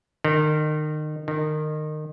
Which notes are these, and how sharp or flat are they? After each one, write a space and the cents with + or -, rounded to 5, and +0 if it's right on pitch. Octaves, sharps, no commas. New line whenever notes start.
D#3 -30
D#3 -25